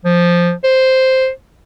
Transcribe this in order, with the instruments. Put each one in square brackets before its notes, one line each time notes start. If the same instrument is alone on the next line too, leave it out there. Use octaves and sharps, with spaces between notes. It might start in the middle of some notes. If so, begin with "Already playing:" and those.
[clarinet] F3
C5